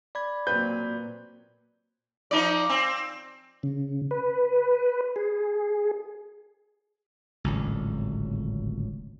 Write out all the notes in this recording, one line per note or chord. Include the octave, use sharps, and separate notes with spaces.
D5 B5 G#6
A#2 F#3 C4 B4 G6
F3 D#4 D5
C4
C#3
B4
G#4
D1 G#1 C#2